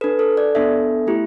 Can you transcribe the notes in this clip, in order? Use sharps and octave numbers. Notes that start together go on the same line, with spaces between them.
D4 A4 B4
A4
D5
B3 D4 A4 E5
A3 E4 G4